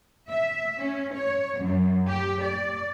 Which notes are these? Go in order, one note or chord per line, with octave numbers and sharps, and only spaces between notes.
E5
C#4
C#5
F#2
G4
D5